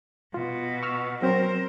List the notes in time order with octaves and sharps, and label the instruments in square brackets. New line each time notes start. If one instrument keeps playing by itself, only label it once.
[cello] B2 [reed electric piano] F4
[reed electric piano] C#6 E6 F6
[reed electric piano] F#3 C4 [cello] A#4 C5